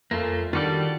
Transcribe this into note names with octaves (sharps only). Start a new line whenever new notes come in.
F2 A#2 A3 A#3 F4
D#3 G3 D4 F4 F#4 A4